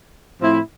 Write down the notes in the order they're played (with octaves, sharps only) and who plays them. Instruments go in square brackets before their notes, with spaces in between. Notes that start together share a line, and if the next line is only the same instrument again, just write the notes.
[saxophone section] A2 F3 C4 E4